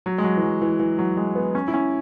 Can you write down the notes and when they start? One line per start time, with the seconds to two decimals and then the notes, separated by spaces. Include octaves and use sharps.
0.06 F#3
0.18 G#3
0.24 F#3
0.37 E3
0.42 F#3
0.61 E3
0.79 E3
0.99 F#3
1.17 G#3
1.35 B3
1.55 C#4
1.68 E4
1.74 C#4